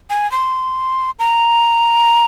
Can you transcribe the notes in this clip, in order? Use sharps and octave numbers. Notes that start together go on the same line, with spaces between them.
G#5
C6
A#5